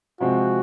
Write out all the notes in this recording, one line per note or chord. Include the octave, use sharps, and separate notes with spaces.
C3 F3 G#3 C4 F#4